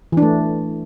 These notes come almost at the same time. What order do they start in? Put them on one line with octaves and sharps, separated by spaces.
E3 D4 A3